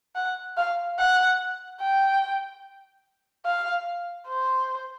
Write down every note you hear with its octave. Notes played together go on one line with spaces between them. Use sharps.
F#5
F5
F#5
G5
F5
C5